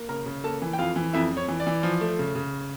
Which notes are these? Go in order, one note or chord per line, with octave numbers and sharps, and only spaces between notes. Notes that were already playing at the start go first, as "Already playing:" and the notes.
Already playing: A#3
C#3 A#4 A#5
C#3
A#3 A4 A5
E3
G5
F2 F4 F5
E3
F2 E4 E5
F2
C#5
E3
D5
E3
F3
A3
C#3
C#3